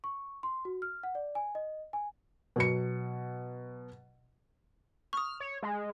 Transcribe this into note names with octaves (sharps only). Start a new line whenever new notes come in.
C#6
C6
F#4
F6
F#5
D5
G#5
D#5
G#5
B2 F#3 C#7
C#6 D#6 F6
C#5
G#3